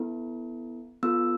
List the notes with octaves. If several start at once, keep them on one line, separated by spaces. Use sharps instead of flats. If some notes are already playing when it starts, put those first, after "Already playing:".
Already playing: B3 E4 A4
B3 F4 A4 E6